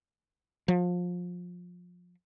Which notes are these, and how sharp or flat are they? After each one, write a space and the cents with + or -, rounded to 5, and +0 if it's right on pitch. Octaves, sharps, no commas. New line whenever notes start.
F3 +25